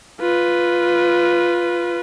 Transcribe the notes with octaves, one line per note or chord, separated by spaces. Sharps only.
F4 B4